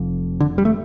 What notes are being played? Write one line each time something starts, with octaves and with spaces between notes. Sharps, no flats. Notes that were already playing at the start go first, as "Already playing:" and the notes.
Already playing: F1 F2
D3
G3
A3